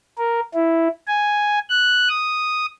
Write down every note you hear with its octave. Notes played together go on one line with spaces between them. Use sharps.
A#4
E4
G#5
F#6
D#6